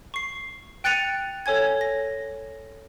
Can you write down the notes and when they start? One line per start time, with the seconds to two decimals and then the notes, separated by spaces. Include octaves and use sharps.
0.14 C#6 C7
0.84 G5 F#6 A6 C#7 D#7 F7
1.46 A4 C#5 G#5 G#6
1.81 A#6